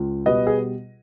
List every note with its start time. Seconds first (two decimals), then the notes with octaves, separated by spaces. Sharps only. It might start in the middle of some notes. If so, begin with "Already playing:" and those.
Already playing: C#2
0.26 B2 G3 B4 D#5
0.47 G#4